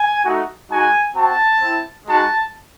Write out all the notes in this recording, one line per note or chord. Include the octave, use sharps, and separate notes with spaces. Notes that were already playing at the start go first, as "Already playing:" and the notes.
Already playing: G#5
A3 D#4 F#4
G#3 D#4 F#4 G#5
C4 F#4 A5
C4 E4
G#3 D#4 F#4 A5